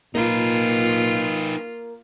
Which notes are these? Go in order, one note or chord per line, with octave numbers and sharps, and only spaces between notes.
A#2 A#3 D#4 F4 B4